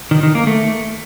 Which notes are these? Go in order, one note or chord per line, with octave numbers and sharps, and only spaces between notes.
D#3
D#3
A#3
A3